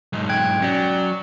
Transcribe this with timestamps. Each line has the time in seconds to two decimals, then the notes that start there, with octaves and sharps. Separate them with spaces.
0.13 B1 G#2
0.29 G5 F#6 G#6
0.62 F#3 C#4 D5